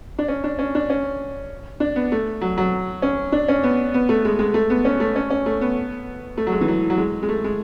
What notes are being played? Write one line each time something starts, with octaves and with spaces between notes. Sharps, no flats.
D4
C#4
D4
C#4
D4
C#4
D4
B3
A3
F#3
F#3
C#4
D4
C#4
B3
B3
A3
G#3
G#3
A3
B3
C#4
A3
C#4
C#4
A3
B3
A3
F#3
G#3
E3
F#3
F#3
G#3
G#3
A3
G#3